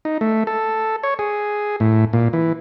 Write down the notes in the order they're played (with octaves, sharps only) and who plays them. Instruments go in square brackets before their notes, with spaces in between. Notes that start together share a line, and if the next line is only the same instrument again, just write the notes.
[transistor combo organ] D#4
A3
A4
C#5
G#4
A2
A#2
E3